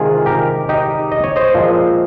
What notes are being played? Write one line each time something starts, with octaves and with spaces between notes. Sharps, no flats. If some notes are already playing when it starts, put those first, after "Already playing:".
Already playing: C3 D#3 G#3 F4 G#4
G4 A#4
D#4 G4
D#5
C#5
C5 D#5
A#2 F3 G#3 C4